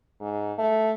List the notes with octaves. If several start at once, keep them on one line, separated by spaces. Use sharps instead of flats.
G#2
A3